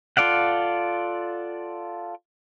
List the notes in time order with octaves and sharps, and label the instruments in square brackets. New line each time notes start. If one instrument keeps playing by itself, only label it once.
[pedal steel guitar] F4 A4 D5 F5 F#5